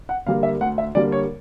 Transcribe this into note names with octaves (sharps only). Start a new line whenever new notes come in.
F#5
D3 G3 A#3 F5
E5
D2 F#5
E5
D3 G3 A#3 D5
C#5